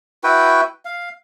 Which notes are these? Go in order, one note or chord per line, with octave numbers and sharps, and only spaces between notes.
E4 F#4 B4 G5
F5